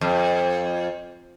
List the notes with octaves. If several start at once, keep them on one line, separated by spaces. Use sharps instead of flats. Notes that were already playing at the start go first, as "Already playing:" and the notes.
F2